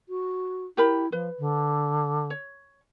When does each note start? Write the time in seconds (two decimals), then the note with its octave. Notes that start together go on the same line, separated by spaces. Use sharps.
0.09 F#4
0.77 E4 G4 A#4 B5
1.12 F3 B4
1.39 D3
2.30 C#5